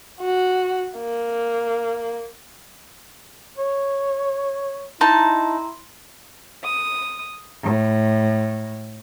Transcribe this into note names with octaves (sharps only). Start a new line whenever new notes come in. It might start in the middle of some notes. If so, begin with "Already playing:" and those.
F#4
A#3
C#5
D#4 E4 A5 A#5 C6
D#6
A2